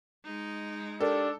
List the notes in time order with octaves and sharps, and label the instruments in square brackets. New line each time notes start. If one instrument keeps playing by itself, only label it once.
[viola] G#3 D#4
[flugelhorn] D4 [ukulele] G4 A#4 D5 [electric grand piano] A4